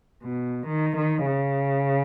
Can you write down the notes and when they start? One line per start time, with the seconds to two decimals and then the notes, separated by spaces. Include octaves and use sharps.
0.24 B2
0.68 D#3
0.97 D#3
1.26 C#3